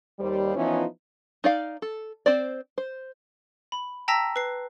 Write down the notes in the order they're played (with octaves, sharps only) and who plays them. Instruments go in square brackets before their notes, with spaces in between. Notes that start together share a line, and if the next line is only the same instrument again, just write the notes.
[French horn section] D#2 G3 C5
E3 F3 B3 C#4 D#4 E4
[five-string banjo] D#4 D5 F5
A4
C4 C5 D5
C5
[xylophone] B5
G5 A5 A#5 E6 A#6 B6
B4 C7